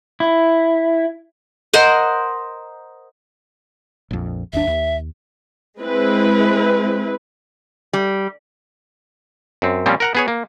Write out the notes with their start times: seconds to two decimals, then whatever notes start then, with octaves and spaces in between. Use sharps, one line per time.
0.20 E4
1.73 A#4 C5 D#5 F#5
4.11 A#1 F2
4.53 G1 D#2 D4 E5
4.67 D#2
5.81 G#3 C4 E4 B4
7.93 G3
9.62 F#2 C4
9.86 A#2 F3 G3 C4 C#4
10.00 A#4 F#5 A#5
10.15 B3 G#4 C#5
10.28 A#3